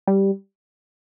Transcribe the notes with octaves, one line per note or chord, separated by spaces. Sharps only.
G3